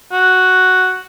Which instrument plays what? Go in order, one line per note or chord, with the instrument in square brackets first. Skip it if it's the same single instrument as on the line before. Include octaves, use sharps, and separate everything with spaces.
[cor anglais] F#4